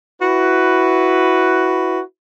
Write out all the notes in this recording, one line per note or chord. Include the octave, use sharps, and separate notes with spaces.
E4 F#4 B4